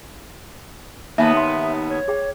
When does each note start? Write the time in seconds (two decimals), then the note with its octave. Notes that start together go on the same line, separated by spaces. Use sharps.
1.18 D#2 A#3 B3 E5 G#5 A5
1.35 E5 G5 C6
1.89 C#5
2.08 G#4 G5